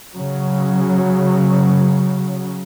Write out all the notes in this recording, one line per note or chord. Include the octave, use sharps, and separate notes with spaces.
C#3 F#3